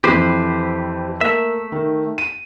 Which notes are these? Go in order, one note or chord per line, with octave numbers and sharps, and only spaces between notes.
F2 E3 G4 B4 C5
A3 A#3 E5
D#3
D#7